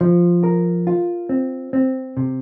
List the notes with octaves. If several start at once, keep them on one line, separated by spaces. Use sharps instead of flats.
F3
A#4
F4
C4
C4
C3